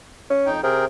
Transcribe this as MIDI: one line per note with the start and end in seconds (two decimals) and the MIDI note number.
0.30 0.51 61
0.46 0.61 41
0.46 0.61 63
0.46 0.61 79
0.63 0.86 48
0.63 0.85 68
0.63 0.85 70
0.63 0.85 79